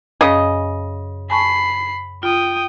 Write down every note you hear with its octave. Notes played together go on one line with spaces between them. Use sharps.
F#2 C#3 D#5
G#5 A5 B5 C#6 C7
F4 G5 D#6